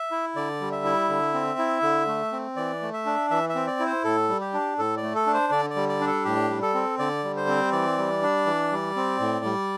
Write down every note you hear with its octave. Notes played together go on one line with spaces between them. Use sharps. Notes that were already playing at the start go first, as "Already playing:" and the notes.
Already playing: E5
E4
D3 D5
G3
E5
E4
D3
C4
E4
D3
A3
C4
E3 D5
A3
E5
D4
E3 E5
E5
C4
D5
E4
C5
A2 A4
G3
G4
D4
A2 A4
D5
A3
A4
D4
C5
D3 D5
D5
G3
D5
D4
A4
A2 G4
G3
A4
C4
D3 D5
G3
C5
C4
E3 D5
G3
D4
E3
G3
C4
A2
G3